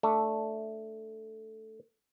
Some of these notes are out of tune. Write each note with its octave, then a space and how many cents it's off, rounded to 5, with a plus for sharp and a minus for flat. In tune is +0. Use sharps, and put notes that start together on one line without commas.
A3 +0 D4 +0